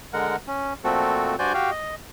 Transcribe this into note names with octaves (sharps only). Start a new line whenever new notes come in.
D3 G#3 A#4 F#5
C#4
A#2 F3 A3 C4 F#4 A4
G2 F#4 C5 D5 G#5 G6
F#4 G4 F5 G5
D#5